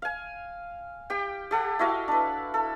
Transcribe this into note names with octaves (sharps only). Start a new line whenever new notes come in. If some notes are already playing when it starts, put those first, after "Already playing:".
F5 G#5
G4 G5
G4 A4 F#5
E4 F#4 D#5 F5
D4 B4
A4